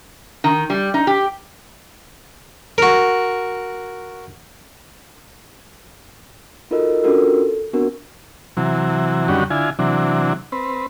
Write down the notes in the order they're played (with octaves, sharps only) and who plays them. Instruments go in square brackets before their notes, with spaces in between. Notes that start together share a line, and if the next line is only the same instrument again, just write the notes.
[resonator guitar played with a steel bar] D#3
G3
D#4
G4
[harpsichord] F#4 A#4
[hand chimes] D#4 F4 F#4 A4 A#4 D#5
C#4 D4 F4 F#4 A4 A#4
A4
B3 C4 D4 F#4 A#4
[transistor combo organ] C3 E3 F#3
F#2 D3 D#3 G3 C#4 F#4
D3 E4 F4 G#5
C3 E3 F#3 D4
C4 B4